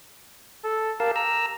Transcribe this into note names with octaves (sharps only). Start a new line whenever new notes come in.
A4
G4 A#4 F5 A5
A#5 E6